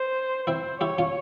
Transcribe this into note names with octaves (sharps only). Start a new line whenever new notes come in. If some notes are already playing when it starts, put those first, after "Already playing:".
Already playing: C5
C4 E4 C5
E4 G4 C#5
C#4 F4